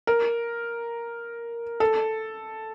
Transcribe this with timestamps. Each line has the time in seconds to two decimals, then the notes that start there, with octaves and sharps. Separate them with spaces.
0.07 A#4
1.80 A4